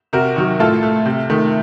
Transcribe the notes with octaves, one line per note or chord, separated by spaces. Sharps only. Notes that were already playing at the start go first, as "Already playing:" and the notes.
C3 F#4 A#4
D#3 F#3
A2 F4 A4
A3
C3
D#3 A3